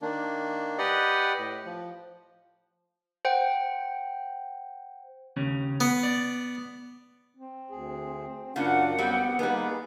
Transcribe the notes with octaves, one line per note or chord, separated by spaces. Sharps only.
D#3 A#3 D4
G4 B4 D5 D#5 F#5
A2
F3
C5 F#5 G5
D#2 C#3 C#4
B3
D5
C4
D2 G#4
F#2 C#3 A#3 D4 F4 F#5
G3 B3 C4
G3 A#3 B3 D#4 G#4 B4